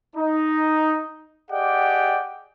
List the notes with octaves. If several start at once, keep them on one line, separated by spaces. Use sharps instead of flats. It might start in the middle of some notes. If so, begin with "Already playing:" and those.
D#4
G4 G#4 D5 D#5 F#5 G5